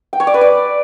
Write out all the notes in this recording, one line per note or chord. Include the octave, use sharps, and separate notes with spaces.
G5
C#5
D5
B4
D5